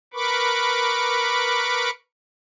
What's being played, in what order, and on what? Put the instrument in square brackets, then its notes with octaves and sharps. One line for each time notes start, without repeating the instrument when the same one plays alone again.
[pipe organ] A#4 B4 B5 C#6 D6